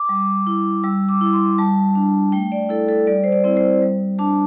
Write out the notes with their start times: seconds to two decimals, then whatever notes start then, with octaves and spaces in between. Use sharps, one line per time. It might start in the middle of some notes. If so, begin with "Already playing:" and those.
Already playing: D6
0.09 G3
0.47 E4
0.83 G3 E6
1.09 D6
1.21 E4
1.33 C6
1.58 G3 A5
1.95 D4
2.32 A3 G5
2.52 D5
2.69 E4 A4
2.89 A4
3.07 G3 D5
3.24 C5
3.32 D5
3.44 C4 E4
3.57 C5
3.82 G3
4.19 D4 A5